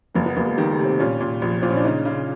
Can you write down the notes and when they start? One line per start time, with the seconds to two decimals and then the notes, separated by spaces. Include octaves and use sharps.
0.14 F#1 A#3
0.26 B3
0.37 F#1 A#3
0.47 G#3
0.57 D#3 G3
0.72 A3
0.79 C3
0.85 C4
0.99 A#2 C#4
1.21 A#2
1.42 A#1
1.62 A#2 C4
1.70 C#4
1.77 D4
1.84 C#3 D#4
2.05 C#3